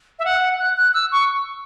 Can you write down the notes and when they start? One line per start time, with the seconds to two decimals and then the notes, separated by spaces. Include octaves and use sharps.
0.19 E5
0.25 F#5
0.59 F#6
0.77 F#6
0.94 E6
1.12 C#6